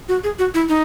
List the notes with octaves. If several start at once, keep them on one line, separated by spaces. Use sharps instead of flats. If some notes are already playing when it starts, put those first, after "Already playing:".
F#4
G#4
F#4
E4
D#4